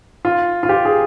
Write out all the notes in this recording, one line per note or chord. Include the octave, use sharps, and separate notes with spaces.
F4
F4
G4
G#4